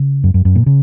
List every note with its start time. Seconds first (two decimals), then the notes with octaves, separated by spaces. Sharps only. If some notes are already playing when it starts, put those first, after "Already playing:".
Already playing: C#3
0.24 F#2
0.34 F#2
0.45 F#2
0.56 A#2
0.66 C#3